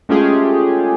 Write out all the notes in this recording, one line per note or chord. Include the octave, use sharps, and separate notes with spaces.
G#3 A3 C#4 F4 G4 G#4